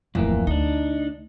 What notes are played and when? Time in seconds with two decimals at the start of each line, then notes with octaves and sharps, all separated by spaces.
0.15 D1 F2 E3 A#3
0.47 D2 D4 D#4